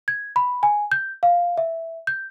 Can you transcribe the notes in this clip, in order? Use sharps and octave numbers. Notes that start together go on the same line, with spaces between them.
G#6
B5
G#5
G6
F5
E5
G6